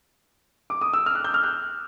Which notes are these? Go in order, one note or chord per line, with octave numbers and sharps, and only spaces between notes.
D6
D#6
E6
F6
F#6
G6
F6
F#6